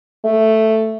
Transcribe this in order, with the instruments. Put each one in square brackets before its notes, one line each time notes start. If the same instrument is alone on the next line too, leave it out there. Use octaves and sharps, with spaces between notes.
[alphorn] A3